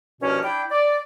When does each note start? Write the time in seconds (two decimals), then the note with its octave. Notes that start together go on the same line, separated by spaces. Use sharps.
0.21 C2 G2 B2 F3 A#3 C#4
0.43 D4 E4 G5
0.70 D5